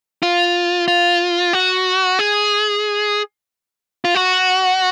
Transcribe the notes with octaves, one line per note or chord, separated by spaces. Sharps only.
F4
F4
F#4
G#4
F4
F#4